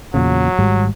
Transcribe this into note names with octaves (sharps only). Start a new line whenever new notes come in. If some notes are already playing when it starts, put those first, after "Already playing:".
E2 A#2 C#3 F#3
G#1 G#2 G3